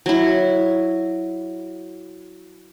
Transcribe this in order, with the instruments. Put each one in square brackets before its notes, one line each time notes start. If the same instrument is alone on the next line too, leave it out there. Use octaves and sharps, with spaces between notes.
[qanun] F#3 E4